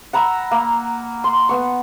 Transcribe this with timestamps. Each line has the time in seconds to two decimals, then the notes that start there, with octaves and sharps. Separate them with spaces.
0.13 F#5 A#5 B5 E6
0.51 A#3
1.24 C6
1.49 B3 C#6